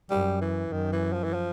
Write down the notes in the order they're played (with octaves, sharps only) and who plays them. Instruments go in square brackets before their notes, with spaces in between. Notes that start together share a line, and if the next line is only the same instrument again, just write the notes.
[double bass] F#2 [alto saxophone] G3
[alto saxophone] E3
[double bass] F#2 [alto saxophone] D#3
[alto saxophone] E3
F3
E3
F3